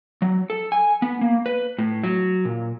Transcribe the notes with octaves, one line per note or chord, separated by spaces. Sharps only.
F#3
A4
G#5
B3
A#3
B4
A2
F#3
A#2